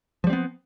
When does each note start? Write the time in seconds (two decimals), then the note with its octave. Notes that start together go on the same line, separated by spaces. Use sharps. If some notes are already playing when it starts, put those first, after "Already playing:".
0.24 F3
0.27 G3
0.30 C4
0.33 B3